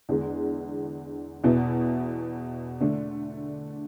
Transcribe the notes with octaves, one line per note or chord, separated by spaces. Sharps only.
E2 D3 G#3
E2 B2 B3 E4
D3 A3 D4